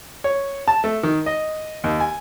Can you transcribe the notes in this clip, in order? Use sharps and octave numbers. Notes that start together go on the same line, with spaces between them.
C#5
A5
A3
D#3
D#5
D#2
G#5